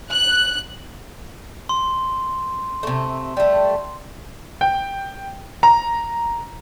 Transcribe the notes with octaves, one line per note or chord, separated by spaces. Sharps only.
F#6
C6
C3 A3
G3 A3
G5
A#5